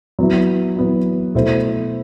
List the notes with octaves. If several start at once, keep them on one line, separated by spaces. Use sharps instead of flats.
F#3 B3 E4
F#3 B3 E4
B2 A3 E4 A4 C5